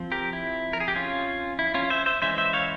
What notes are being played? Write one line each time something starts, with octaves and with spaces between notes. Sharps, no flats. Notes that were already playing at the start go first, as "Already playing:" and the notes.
Already playing: F3 C4
G4 A#4
E4
A#4
G#4
G4
C#4 F4
E4
C#4 F4
C5 E5
C5 E5
E3 G#3 C#4 C5 E5
C5 E5
C#5 F5